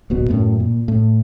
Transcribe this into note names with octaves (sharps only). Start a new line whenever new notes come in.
D1 A#1 B2 B3
F#2 A2
A#2
A2